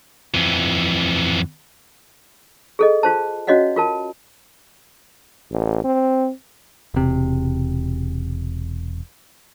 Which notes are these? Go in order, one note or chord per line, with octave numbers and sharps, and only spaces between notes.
F2 E3
G#4 A4 D#5
F4 C5 A5
C#4 F#4 C#5 D#5 F5 F#5
F4 A#4 A5
A1
C4
E1 C3